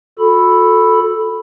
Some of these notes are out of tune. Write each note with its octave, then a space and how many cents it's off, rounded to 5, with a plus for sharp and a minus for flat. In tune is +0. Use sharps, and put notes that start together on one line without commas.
F#4 -40 A4 +0 B5 +0